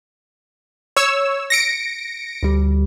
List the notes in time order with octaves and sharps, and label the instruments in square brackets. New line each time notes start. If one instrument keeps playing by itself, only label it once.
[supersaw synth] C#5 E6
A#6 C#7 D7
[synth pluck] D2 G3